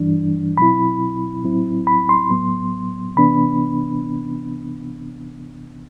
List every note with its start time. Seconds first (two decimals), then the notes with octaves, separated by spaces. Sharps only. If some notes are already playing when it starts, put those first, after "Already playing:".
Already playing: G2 E3 G3 D4
0.57 B2 F#3 C4 E4 B5
1.44 A2 F#3 C4 E4
1.87 B5
2.09 C6
2.30 A2 F#3 B3
3.16 C3 E3 B3 D4 B5